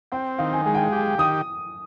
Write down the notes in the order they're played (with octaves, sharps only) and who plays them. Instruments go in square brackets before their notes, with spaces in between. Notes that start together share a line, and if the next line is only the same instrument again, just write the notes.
[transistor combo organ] C4 [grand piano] G5
[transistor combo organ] D#3 [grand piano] F5
[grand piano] G#5
[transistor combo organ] G#3 [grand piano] G#5
[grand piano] G5
G#5
[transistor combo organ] G4
[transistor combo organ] D#3 [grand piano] D#6